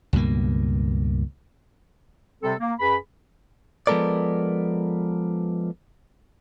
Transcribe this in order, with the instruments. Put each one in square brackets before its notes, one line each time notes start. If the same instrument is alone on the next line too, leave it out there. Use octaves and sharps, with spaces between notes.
[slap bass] C#2 G2 B2 A#3
[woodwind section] C3 G3 C4 A4
A#3
F#2 G#4 B4 B5
[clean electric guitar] F3 G#3 B3 A4 A#4 D5